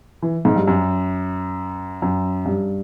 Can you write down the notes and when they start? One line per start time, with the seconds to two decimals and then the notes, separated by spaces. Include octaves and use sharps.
0.22 E3
0.45 G#2
0.56 G2
0.67 F#2
2.02 F#2
2.46 G2